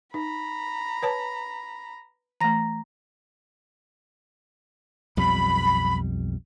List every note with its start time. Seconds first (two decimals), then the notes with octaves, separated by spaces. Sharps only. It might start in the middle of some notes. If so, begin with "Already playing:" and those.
0.14 D#4 A#5 B5
1.03 B4 C#5 A5
2.41 E3 A3 A#5 A#6
5.17 B1 F2 G3 B5